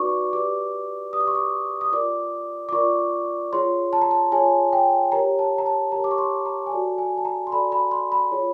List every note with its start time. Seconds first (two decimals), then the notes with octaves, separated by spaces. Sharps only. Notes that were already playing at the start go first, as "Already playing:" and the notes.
Already playing: D#4 F#4 B4 D5 C#6 D6
0.32 G4 B4 D5 D6
1.13 G4 B4 D5 D#6
1.21 D6
1.27 C#6
1.35 D6
1.81 D#6
1.93 F4 A#4 D5 D6
2.69 D6
2.72 F4 A#4 D5 C#6
3.53 F4 G#4 C#5 C6
3.93 A5
4.02 A#5
4.11 A5
4.32 F4 G#4 C#5 G#5
4.73 G5
5.12 G4 A#4 C#5 A#5
5.39 A5
5.58 A#5
5.66 A5
5.92 G4 A#4 C#5 A#5
6.04 D6
6.11 C#6
6.18 C6
6.46 A#5
6.66 G#5
6.72 F#4 A4 D5 A5
6.98 G#5
7.17 A5
7.25 A#5
7.47 C6
7.52 F#4 A4 D5 B5
7.72 B5
7.91 C6
8.12 B5
8.32 F4 G#4 C#5